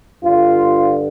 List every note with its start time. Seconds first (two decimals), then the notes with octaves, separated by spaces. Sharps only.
0.24 G2 D3 F4